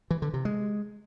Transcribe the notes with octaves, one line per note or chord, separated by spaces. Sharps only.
E3
D3
C3
G#3